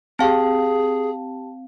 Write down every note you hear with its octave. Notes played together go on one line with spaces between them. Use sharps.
C4 G4 G#4 F5 G5 A5